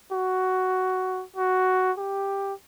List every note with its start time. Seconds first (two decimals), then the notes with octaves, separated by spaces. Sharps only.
0.12 F#4
1.36 F#4
1.98 G4